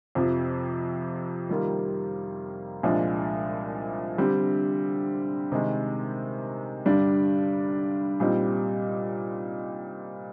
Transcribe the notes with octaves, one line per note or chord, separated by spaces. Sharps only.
F2 C3 F3
D#3 G3 A#3 F4
C2 A#2 F3 G#3 D4
D3 G3 C4 G4
C3 D#3 G#3 D#4
G2 D3 G3 D4
A#2 G3 C4 D#4